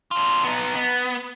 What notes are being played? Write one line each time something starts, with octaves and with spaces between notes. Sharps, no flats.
D4 F4
B3 D#4
B3